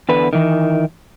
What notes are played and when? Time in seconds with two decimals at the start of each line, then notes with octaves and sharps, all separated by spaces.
0.09 E2 D3 B4
0.33 D#3 E3